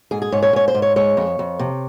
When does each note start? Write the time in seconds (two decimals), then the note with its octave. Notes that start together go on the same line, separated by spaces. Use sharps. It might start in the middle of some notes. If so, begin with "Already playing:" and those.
0.11 G#2 G#4
0.22 G#4
0.32 G#2 C#5
0.43 C#5
0.53 G#2 C#5
0.68 C5
0.74 G#2
0.82 C#5
0.96 G#3 C#5
1.17 F2
1.39 F2
1.59 C3